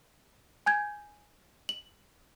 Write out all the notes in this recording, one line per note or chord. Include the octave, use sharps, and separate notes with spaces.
G#5 G6 G#6
F#7